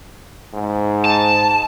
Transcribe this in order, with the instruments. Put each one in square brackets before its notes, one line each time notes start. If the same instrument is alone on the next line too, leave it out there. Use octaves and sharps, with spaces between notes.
[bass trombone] G#2
[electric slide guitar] A5